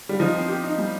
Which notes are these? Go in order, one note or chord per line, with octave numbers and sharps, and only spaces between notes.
G3
F3 D#4
C4
G4
D#4
G3